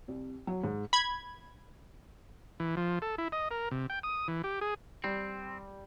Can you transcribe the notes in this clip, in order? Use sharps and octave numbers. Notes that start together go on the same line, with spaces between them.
C2
F#3
G#2
B5 G#6
E3
F3
A4
E4
D#5
A#4
C3
G5
D#6
E3
G4
G#4
G3 C4